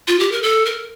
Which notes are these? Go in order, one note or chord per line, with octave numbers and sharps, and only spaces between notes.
F4
G4
A#4
A4
A#4